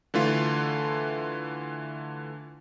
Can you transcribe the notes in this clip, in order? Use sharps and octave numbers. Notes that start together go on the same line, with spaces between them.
D3 E3 A3 F4